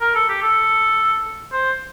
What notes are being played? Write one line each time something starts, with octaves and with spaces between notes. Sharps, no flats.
A#4
A4
G4
A4
C5